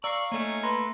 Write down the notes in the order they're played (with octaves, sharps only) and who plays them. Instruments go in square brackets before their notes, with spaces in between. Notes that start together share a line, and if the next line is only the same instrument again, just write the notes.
[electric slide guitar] D5 [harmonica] F5 C#6 [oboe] A#5 [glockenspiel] E6 C7
[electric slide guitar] A3 A#3 [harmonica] C#4 D#4 G#5
[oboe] B4 [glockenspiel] A#5 C6 A#6